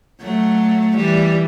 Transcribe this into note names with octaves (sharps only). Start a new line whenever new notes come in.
F#3 A3
E3 G3